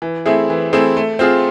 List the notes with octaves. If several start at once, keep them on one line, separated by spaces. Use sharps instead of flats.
E3
A3 C4 E4 G#4
E3
A3 C4 E4 G#4
A3
C4 F4 G#4